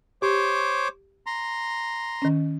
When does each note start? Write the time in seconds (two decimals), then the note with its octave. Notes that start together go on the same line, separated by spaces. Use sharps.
0.22 G4 C5 C#5 D6
1.26 A#5 C6
2.22 D#3 C#4